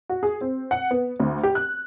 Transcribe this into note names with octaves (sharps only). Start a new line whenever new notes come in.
F#4
G#4
C4
F#5
B3
D2
G4
F#6